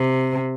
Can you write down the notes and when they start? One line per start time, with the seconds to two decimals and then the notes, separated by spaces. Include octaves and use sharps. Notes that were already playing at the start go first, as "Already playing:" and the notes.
Already playing: C3